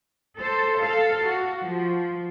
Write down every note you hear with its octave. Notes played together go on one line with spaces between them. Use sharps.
A4 C5
A4 F5
F#4
F3